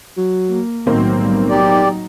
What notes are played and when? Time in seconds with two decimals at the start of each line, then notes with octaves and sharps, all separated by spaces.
0.17 F#3
0.49 A#3
0.87 B1 A2 D#3 F#3 A#3 C4
1.19 G3
1.50 F#3 D#4 G4 D5